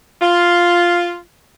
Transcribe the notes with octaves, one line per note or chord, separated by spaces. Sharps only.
F4